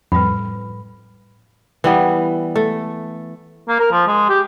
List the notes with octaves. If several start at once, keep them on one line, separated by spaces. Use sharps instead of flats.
F2 A2 G3 B4 B5
E3 G3 B3
A3
A#3
A#4
F3
G#3
G4